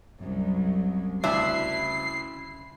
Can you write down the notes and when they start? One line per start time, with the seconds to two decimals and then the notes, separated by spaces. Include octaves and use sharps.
0.19 C2 F#2 F#3
1.24 D2 C#3 D4 E4 C7